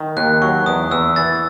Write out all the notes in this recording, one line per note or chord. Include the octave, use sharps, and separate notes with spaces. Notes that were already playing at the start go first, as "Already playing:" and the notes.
Already playing: D#3
D#2 F#6
F#3 C#6
E2 D#6
E2 E6
E3 A6